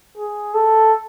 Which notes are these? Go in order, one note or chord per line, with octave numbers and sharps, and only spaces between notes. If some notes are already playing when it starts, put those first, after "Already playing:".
G#4
A4